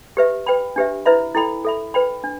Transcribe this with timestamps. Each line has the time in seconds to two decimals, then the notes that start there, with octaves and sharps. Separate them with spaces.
0.17 G4 B4 E5
0.46 B4 G5 B5
0.76 D4 G4 B4 E5
1.06 E4 B4 E5 B5
1.35 E4 A4 G5 B5
1.65 A4 E5 B5
1.94 B4 G5 B5
2.24 D4